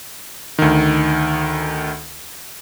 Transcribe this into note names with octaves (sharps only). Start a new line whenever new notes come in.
D2 D#3